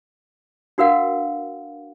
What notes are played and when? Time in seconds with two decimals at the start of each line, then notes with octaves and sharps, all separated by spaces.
0.78 D4 F#4 A#4 B4 F5 F#5